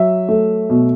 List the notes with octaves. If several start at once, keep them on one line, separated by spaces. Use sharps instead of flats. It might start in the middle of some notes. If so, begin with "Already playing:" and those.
Already playing: F#3 E5
A3
B2